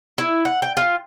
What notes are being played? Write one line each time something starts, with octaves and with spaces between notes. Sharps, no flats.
E4
F#5
G5
F4